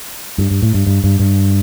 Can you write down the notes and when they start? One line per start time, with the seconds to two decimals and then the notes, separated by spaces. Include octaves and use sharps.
0.38 G2
0.51 G2
0.63 A2
0.74 G2
0.87 G2
1.04 G2
1.20 G2